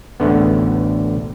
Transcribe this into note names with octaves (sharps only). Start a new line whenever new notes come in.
A1 D2 D3 B3